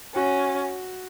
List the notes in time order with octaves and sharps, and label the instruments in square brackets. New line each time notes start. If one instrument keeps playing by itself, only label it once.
[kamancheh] C#4 [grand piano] F#4